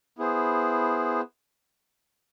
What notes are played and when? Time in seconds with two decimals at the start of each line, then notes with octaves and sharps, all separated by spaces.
0.19 B3 E4 G#4 C5